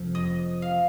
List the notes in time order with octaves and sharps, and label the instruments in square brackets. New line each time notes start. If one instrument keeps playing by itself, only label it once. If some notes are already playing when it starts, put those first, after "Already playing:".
Already playing: [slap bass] F1 F2 F3
[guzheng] D#5
F5